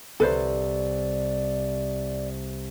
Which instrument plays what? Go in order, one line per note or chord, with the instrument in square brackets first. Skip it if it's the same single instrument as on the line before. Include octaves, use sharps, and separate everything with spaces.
[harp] C2 [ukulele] A4 B4 C5 [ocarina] D5